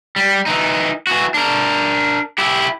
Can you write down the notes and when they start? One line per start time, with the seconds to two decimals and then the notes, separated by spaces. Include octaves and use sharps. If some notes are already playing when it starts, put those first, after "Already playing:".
0.16 G3
0.46 E3 D#4
1.07 E3 F#4
1.34 D4 A#4
2.38 E4 G4